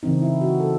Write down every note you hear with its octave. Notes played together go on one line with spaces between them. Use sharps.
C#3 E3 C4 D#4
E4
F#4
A4